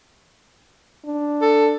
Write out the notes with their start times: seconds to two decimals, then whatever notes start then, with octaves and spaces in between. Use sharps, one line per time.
1.05 D4
1.42 A4